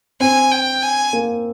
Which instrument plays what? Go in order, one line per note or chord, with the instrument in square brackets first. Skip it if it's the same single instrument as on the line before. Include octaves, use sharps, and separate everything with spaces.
[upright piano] C4 [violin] G#5
[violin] G5
G#5
[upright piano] A#3